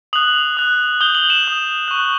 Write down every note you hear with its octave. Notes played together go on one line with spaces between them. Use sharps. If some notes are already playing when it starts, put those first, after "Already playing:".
D#6 F#6 F#7
D#6 F#6
D#6 G6 G7
F#7
E7
D#6 G6
C#6 F#6